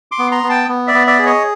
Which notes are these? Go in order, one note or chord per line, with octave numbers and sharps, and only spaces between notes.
C6 D6
B3
A#5 C6
B3
G5 A5
B3
D5 E5
B3
D5 E5
G#4
C#5 D#5